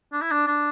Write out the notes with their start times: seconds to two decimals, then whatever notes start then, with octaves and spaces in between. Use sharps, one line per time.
0.13 D4
0.22 E4
0.31 D4
0.47 D4